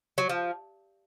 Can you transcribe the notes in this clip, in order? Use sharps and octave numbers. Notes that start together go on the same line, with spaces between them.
F#3
F3